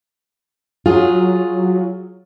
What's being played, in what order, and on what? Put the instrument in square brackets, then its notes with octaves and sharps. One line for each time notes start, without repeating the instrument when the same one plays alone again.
[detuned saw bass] F#3 [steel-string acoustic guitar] F4 G#4